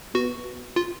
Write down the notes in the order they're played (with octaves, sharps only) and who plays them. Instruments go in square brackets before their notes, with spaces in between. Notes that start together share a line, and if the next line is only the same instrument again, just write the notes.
[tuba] B3 [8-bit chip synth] F#4
[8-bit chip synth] F4